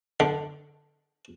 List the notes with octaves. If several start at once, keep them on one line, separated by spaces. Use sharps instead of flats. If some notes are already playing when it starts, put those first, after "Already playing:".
D3